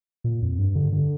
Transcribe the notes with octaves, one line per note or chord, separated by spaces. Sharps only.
A#2
F2
G2
D3
D3